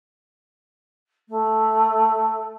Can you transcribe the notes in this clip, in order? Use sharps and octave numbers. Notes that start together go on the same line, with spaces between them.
A3